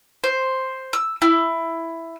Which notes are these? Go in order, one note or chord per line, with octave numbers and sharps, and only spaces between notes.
C5
E6
E4